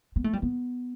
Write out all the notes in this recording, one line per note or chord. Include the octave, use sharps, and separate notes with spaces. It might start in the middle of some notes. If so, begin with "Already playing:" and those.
B3
A3
G3
B3